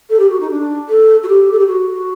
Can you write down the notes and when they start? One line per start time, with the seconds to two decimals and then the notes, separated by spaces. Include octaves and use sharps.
0.09 A4
0.19 G4
0.30 F#4
0.40 D#4
0.50 D4
0.89 A4
1.23 F#4
1.28 G4
1.52 A4
1.58 G4
1.67 F#4